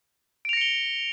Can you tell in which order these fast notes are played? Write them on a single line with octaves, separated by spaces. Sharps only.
D7 F7 A#6 C#7 G7